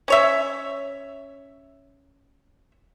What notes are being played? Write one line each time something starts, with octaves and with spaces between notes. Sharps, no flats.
C#4 C#5 E5